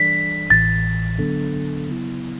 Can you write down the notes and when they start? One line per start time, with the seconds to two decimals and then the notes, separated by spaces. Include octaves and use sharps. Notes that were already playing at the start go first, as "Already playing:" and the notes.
Already playing: E3 G3 D4 A4 D5 B6
0.50 A1 A2 E3 A6
1.19 D3 F#3 B3 D4 A4
1.88 C#3 F#3 B3 E4